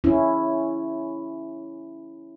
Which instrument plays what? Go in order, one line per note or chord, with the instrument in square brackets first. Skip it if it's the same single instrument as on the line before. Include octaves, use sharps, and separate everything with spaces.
[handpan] C#4 E4